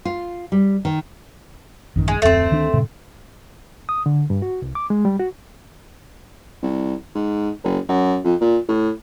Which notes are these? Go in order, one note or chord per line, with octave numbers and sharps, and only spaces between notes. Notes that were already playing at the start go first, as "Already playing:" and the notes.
F4
G3
D#3
A1 F#2 D#3
G#3
D1 F2 A3 C4
D2 D#3 D4
G2 A#2 C#3
D#6
D3
G2
F#4
C2
D6
G#3
G3
F#4
C2
G#2
F#1
F#2
F2
A#2
A2